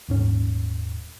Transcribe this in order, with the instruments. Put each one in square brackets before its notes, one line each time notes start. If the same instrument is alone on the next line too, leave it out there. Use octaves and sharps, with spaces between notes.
[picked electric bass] D#1 G#2 C#4